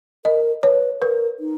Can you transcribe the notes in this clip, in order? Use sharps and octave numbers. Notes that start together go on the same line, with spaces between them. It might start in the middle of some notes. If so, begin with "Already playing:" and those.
A#4 D#5
B4 C#5
A#4 B4
D#4